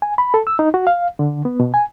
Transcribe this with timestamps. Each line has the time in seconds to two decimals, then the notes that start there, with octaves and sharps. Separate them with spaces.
0.02 G#5
0.18 B5
0.34 A4
0.47 E6
0.59 D#4
0.74 F#4
0.87 F5
1.19 D3
1.45 B3
1.60 B2
1.74 G#5